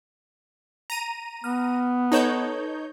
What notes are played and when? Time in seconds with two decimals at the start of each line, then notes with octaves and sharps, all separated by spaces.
0.90 A#5 D#7
1.44 B3 F6
2.12 D#4 A4 B4 C#5 A5 G6